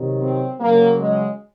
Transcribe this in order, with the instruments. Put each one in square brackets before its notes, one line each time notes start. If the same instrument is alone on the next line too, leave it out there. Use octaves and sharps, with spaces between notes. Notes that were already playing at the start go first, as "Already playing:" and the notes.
Already playing: [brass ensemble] C3 D#3 F#3
C4
C#3 F#3 A#3
G#3